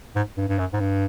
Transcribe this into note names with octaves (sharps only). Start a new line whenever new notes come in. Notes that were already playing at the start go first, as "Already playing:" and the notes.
G#2
G2
G2
F#2
G#2
G2